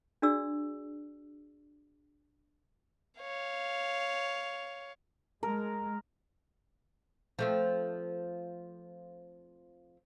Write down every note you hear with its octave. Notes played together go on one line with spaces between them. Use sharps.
D4 F#4 G#4 D5 E6
C#5 F5
G#3 A#4
F3 A3 C4